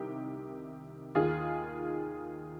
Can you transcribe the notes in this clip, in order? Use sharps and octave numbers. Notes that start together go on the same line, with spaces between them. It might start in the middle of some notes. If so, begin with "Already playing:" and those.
Already playing: C2 C3 D#3 G4
D#2 D#3 F4 G#4